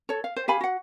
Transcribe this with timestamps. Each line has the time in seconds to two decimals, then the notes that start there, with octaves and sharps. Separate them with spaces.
0.09 A4 C#5
0.24 F5
0.36 C5
0.48 G4 F5 G#5 B5
0.61 F#4 F#5